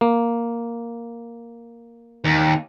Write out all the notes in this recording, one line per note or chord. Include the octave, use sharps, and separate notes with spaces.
A#3
D#2